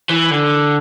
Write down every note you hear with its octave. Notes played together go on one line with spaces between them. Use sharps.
E3
D3